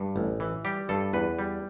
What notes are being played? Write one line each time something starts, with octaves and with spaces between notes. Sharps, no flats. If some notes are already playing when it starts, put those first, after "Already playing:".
Already playing: G2
A1
E3
G3 G4
G2 A4
E2 B4
G3